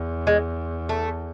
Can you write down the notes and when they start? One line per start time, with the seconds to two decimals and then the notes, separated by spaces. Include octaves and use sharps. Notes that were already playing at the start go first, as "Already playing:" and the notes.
Already playing: E2
0.27 G#3
0.89 A3